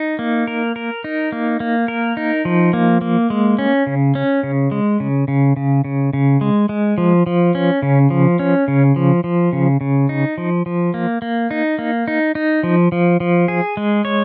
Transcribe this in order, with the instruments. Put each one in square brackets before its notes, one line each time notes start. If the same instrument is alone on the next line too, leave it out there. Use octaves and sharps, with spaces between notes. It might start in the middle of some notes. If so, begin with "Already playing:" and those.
Already playing: [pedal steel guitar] D#4
A#3
A#4
A#4
D#4
A#3
A#3
A#4
D#4
F3
A#3
A#3
G#3
C#4
C#3
C#4
C#3
G#3
C#3
C#3
C#3
C#3
C#3
G#3
G#3
F3
F3
C#4
C#3
F3
C#4
C#3
F3
F3
C#3
C#3
D#4
F3
F3
A#3
A#3
D#4
A#3
D#4
D#4
F3
F3
F3
G#4
G#3
C#5